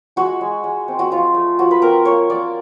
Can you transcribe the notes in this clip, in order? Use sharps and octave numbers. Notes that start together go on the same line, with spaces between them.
G#3 F#4
G#3
G#3
C4
F#4
F3 F4
A3
F3 F#4
B4
C4 A#4
A#3 C#5
A#3 D5